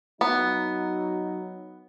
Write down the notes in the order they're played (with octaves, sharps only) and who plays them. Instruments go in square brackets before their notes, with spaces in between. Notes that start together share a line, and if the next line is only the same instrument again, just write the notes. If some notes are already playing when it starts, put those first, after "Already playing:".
[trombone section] F#3 D#4 [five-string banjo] B3